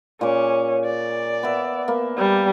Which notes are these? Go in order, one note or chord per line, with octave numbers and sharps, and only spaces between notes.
A#2 C#4 G#4 D6
D5
B3 E5
A#3 B3
G3